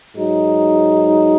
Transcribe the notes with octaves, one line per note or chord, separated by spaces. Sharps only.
G#2 F#3 D#4